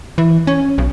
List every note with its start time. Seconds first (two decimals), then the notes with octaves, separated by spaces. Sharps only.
0.18 E3
0.47 C#4
0.78 B1